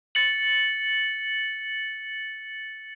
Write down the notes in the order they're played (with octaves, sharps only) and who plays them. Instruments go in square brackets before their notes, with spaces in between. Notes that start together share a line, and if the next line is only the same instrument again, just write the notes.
[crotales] A6 C#7 F#7